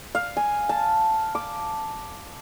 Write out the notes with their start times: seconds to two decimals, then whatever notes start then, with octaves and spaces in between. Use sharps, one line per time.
0.15 F5
0.37 G#5
0.69 A5
1.35 D6